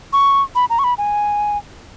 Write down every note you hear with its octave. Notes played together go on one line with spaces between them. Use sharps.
C#6
B5
A#5
C#6
B5
G#5